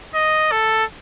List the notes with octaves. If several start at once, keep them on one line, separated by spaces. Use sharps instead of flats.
D#5
A4